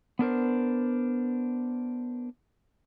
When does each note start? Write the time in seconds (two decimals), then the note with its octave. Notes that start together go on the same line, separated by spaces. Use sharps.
0.19 B3 D4 A#4 C5